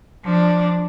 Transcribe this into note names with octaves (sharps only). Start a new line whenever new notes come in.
F3 D4